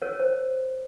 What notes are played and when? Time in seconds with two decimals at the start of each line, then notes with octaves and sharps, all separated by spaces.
0.02 A#4 C#5
0.20 C5